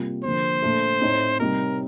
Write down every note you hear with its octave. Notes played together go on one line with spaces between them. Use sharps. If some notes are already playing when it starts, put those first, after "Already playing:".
Already playing: C3 G3 A#3 F4
D3 F3 A#3 C5
A#2 A3 D4
A2 A3 C4 D#4
C3 G3 C4 D#4 A#4